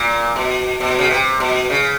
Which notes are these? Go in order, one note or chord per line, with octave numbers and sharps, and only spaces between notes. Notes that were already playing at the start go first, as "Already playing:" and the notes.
Already playing: A#2
B2
B2
C#3
C3
B2
C#3